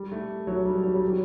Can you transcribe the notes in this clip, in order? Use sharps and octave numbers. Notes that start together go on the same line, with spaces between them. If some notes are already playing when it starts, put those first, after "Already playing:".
Already playing: G3
A3
F#3
G3
F#3
G3
F#3